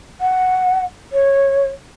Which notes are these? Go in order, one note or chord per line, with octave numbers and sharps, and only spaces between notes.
F#5
C#5